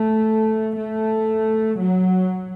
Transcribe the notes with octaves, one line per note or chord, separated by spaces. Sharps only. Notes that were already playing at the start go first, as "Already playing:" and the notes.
Already playing: A3
A3
F#3